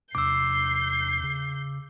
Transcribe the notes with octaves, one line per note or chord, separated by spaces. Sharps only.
E2 C3 D4 D6 E6 G6 C7
C#3